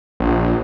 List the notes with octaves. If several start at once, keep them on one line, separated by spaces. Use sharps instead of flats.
A#1